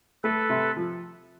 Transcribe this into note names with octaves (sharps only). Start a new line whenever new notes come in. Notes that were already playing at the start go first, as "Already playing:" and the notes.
A3 A4 B4
C3
F3